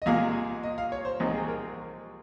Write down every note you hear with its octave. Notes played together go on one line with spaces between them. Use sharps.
D#5
C2 A#2 G#3 F5
D#5
F5
C#5
C5
C2 A#2 G#3 C4 D#4
G#4
A#4